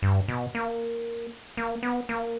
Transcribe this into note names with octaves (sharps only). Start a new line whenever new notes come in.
G2
B2
A#3
A#3
B3
A#3